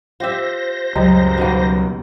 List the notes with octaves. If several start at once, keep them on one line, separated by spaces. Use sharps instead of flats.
F4 G4 C5 E5 A#6
C#2 F#2 G3 D#5
B2 D#3 A#3